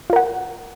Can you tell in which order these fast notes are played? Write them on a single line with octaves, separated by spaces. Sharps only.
F4 A#4 F#5